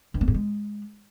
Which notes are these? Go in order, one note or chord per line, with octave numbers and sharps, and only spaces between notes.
G2
A#3
G2
G#3